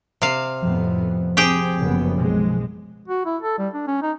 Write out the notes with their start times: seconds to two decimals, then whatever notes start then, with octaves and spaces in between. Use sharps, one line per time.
0.22 C3 F5
0.62 F2 A2 F3 B3
1.37 C4 G4 G#4 G5
1.79 F#1 F#2 B3
2.18 B1 G#3
3.08 F#4
3.26 E4
3.42 A4
3.58 G3
3.74 D4
3.87 C#4
4.02 D#4